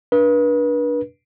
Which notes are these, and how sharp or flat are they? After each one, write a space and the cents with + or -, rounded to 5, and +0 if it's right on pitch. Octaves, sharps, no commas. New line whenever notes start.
D4 +0 B4 -35